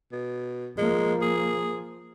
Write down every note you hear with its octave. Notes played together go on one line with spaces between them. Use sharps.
B2
F3 G#3 A#3
G#4